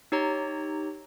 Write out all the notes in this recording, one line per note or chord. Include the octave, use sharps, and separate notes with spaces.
D#4 G4 C#5 A#5